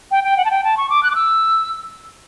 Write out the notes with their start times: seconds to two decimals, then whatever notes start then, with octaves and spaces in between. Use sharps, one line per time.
0.11 G5
0.24 G5
0.37 F#5
0.45 A5
0.51 G5
0.64 A5
0.77 C#6
0.90 D6
1.03 F#6
1.11 D6
1.15 E6